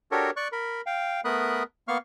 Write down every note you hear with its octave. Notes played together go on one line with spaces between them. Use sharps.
D4 F#4 G4 A4 A#4 C#5
D5 C#6 F#6
A#4 B5
F5 G5
A3 B3 A#4 B5 D#6 F#6
A#3 B3 F5 C#6 F6